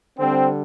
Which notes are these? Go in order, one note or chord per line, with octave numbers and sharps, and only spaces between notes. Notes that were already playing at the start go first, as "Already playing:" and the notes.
D3 G3 C4